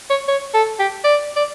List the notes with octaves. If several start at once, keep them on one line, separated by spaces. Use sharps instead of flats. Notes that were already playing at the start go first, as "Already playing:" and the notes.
C#5
C#5
A4
G4
D5
D5